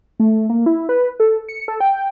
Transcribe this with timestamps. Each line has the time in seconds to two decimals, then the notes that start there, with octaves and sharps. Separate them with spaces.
0.20 A3
0.50 A#3
0.66 E4
0.89 B4
1.20 A4
1.49 C#7
1.68 A4
1.80 G5